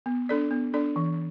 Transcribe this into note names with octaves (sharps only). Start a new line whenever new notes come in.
B3
D4 A4 D5
B3
D4 A4 D5
E3